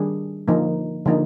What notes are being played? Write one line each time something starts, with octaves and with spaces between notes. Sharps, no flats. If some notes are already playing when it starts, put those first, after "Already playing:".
Already playing: D#3 G3 D4 G#4
D3 F3 A#3 D#4
D3 F3 A#3 D#4